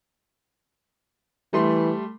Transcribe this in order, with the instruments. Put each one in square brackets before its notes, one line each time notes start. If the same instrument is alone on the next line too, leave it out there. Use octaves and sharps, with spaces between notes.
[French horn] E3 [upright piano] G3 A3 C6